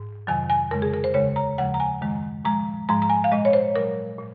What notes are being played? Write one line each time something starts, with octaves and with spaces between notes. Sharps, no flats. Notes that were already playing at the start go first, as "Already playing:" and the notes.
Already playing: G#2
F2 C3 D#3 F#3 G#5
G#5
F2 C#3 G#3 A#4
G#4
A#4
C5
D#2 C#3 G#3 C#5
A#5
D#2 C#3 F3 G#3 F#5
A#5
G#5
F#2 D#3 G#3
A#2 F3 G#3 A#5
G#2 F3 G#3 A#5
A#5
G#5
F5
A#2 G#3 D#5
C#5
C5
A#2 F#3 A#4
A#2